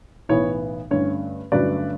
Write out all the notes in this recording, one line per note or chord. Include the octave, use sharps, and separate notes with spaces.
B1 A2 E3 B3 C#5
G2 D3 A3 C#4 C#5
G1 G2 F#3 A3 C#4 B4 D5